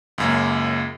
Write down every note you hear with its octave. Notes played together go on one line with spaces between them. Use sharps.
C#2 F#2 A#3